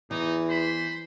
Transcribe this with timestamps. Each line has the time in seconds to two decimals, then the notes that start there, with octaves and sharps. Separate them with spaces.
0.11 E2 E3 D#4
0.49 C5 B5